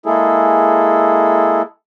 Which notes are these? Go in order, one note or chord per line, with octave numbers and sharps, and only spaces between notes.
G#3 A#3 E4 G#4 A4